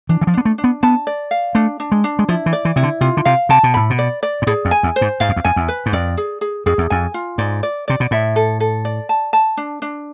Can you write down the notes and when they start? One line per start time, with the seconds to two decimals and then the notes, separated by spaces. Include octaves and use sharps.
0.09 E3 D4
0.21 E3
0.27 F3
0.34 B3 D4
0.45 A3
0.58 D4
0.64 B3
0.83 B3 A5
1.07 D5
1.31 F5
1.55 A3 D4
1.80 D4
1.92 G#3
2.04 D4
2.19 G#3
2.29 F3 E4
2.46 E3
2.53 D5
2.65 E3
2.76 C3 E4
2.83 D3
3.01 C3 F4
3.17 D3
3.25 C3 F5
3.49 C3 A5
3.63 B2
3.74 A2 B5
3.90 B2
3.99 D5
4.23 D5
4.42 G#2
4.47 A2 G#4
4.65 F2
4.71 G#5
4.83 E2
4.96 C5
5.01 G#2
5.20 G#2 F5
5.29 F2
5.36 E2
5.44 F2 G#5
5.56 E2
5.68 B4
5.86 G#2
5.93 F2 D5
6.18 G#4
6.41 G#4
6.66 F2 G#4
6.78 E2
6.90 F2 G#5
7.14 F4
7.38 G#2 D5
7.63 D5
7.88 C3 D5
8.00 B2
8.11 A2 E5
8.36 A4
8.60 A4
8.85 D5
9.09 A5
9.33 A5
9.57 D4
9.82 D4